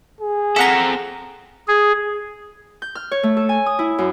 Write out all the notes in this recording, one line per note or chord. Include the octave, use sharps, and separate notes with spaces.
G#4
C4 A4 E5 F#5 G#5 A#5 B6
G#4
G6
F6
C#5
A3
A4
G#5
D#6
E4
F#2